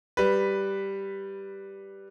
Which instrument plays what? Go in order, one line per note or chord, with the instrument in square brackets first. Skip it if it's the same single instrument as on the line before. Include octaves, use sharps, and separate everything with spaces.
[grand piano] G3 B4